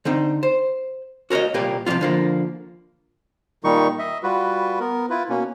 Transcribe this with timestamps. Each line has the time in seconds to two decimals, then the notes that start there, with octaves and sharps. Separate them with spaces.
0.05 D3 C4 D#4
0.43 C5
1.30 F#4 A#4 C5 C#5 D#5
1.54 C2 A#2 A#3 G4 B4
1.86 C3 F3 G3 A#3 F4
2.01 D3 F3 A#3
3.64 A#2 D#3 G3 D#4 C#6
3.99 D#5 E5
4.23 G3 F4 F#4 B4
4.80 B3 A#4
5.10 E4 F4 B4
5.29 B2 A#3 C#4